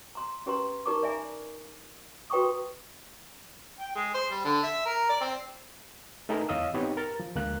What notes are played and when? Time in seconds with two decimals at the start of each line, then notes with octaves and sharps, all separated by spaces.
0.15 A#5 C6
0.46 C#4 G4 B4 A#5 C6
0.86 D#4 G4 A#4 A#5 C#6 D6
1.03 D5 E5 G#5 A#5
2.30 F#4 B4 G5 A#5 C#6 D#6
3.80 G5
3.95 G#3
4.14 C5
4.31 G3
4.45 D3
4.63 E5
4.85 A#4
5.09 D5
5.21 C4
6.29 A3 D#4 G#4 A#4 B4
6.49 E2 C#5 D#5 F5 D#6 E6
6.74 B3 C4 D#4 G4 B4 C#5
6.97 A#4 A6
7.20 F3
7.35 D2 G#3 A#3 F#6